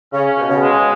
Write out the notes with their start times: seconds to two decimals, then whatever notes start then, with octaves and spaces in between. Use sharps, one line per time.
0.13 C#3 C#4
0.37 B2
0.50 C#3
0.62 G#3